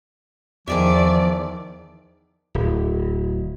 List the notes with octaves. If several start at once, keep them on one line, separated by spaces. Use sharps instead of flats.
E2 D#3 F3 G#4 D5 E5
D1